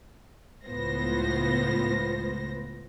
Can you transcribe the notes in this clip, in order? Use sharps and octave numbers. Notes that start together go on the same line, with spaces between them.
C#2 A2 B3 F4 C5 A#6